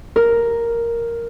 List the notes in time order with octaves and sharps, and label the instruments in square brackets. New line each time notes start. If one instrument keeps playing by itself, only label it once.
[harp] A#4